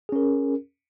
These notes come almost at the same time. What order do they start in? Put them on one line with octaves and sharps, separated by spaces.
G#4 C#4 A#4